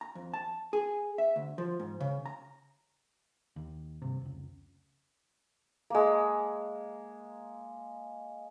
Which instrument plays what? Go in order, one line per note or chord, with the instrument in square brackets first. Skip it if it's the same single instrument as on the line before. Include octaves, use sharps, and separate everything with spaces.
[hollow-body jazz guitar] A#5
F2
A5
G#4
E5
D2
F3
G#2
C#3
A#5
[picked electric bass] D#2
G2 C3
F1 C#2
[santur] G#3 A#3